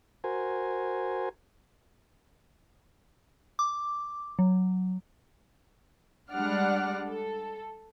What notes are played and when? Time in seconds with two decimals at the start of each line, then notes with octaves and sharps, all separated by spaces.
0.24 F#4 A#4 C5 G#5
3.59 D6
4.39 F#3
6.31 G3 G#3 D4 D5 F#5 F6
7.08 A4